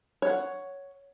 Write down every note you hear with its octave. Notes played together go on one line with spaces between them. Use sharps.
C#5 F#5